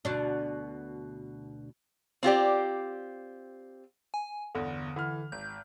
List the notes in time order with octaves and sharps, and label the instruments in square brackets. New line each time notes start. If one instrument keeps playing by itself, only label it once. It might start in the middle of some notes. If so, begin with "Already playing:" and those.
[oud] D2 B2 D4
[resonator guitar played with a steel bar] C4 F4 G4 D5
[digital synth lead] G#5
[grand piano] G1 E2 [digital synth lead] D3
[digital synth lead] D3 [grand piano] E3 F6
[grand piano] G#1 [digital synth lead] G6